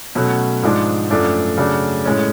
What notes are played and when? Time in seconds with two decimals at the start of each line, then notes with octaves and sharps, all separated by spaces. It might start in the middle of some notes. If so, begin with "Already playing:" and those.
0.15 B2 F#3 A3 C#4
0.63 G#2 F3 G#3 D4
1.11 F#2 F3 A3 D4
1.58 C#3 F#3 A3 D4
2.05 A2 G#3 C#4